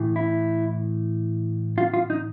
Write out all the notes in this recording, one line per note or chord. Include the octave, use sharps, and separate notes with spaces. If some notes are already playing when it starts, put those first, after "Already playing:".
Already playing: A2 E3
E4
F4
F4
D#4